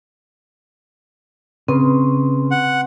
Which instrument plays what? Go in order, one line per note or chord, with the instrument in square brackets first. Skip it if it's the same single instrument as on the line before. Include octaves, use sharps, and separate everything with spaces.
[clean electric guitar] C#3 [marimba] C4 [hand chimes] B4 C6
[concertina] F#5